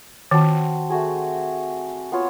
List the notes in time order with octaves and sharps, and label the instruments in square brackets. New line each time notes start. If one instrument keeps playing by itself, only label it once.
[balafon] D#3 [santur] C4 F#4 A5
[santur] A3 F#4 G#4
B3 F4 C#5